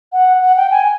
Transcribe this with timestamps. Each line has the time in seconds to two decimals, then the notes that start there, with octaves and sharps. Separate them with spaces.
0.13 F#5
0.42 F#5
0.57 G5
0.71 G#5